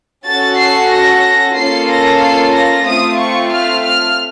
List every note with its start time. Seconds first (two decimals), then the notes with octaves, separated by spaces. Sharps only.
0.25 C#4 F#4 A4 A6
0.58 C7
0.91 A#6
1.57 A#3 C#4 F4 A4 C7
1.90 A#6
2.21 C7
2.55 A#6
2.87 A3 C4 F4 D#6
3.20 C#6
3.53 F6
3.85 F6